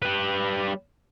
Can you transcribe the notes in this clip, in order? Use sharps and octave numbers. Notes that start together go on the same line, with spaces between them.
G3 B4